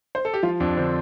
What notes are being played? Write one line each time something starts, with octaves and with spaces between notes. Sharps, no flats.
C5
A4
G4
F3 F4
F2 D4
D3 C4